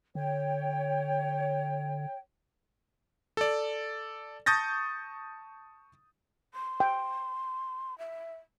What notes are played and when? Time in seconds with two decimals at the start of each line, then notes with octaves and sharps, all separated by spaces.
0.15 D3 C#5 G5
3.37 A4 D5
4.46 A5 C#6 D#6 G6 A6 A#6
6.53 C6
6.80 G5
7.98 E5